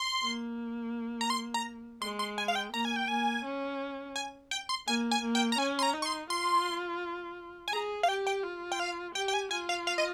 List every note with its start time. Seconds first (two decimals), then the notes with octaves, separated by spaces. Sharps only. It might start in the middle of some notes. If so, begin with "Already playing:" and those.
Already playing: C6
0.23 A#3
1.21 A#5
1.30 C6
1.54 A#5
2.02 G#3 C6
2.19 C6
2.38 G#5
2.48 F5
2.55 G5
2.72 A#3 A#5
2.85 G#5
2.96 G5
3.08 A#3 G#5
3.45 C#4
4.16 G#5
4.51 G5
4.69 C6
4.87 A#3 G#5
5.11 G#5
5.22 A#3
5.35 G5
5.52 A#5
5.58 C#4 G#5
5.79 C6
5.83 A#5
5.94 D#4
6.02 C#6
6.06 C6
6.30 F4 C6
7.68 G#5
7.72 G#4 A#5
8.03 F5
8.08 G4 G5
8.27 G5
8.43 F4
8.72 G5
8.80 F5
9.15 G4 G5
9.28 G5
9.34 G#5
9.51 F4 G#5
9.69 F5
9.87 F5
9.98 D#5